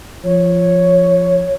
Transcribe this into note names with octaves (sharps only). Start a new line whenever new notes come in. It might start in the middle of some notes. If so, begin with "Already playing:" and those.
F3 C#5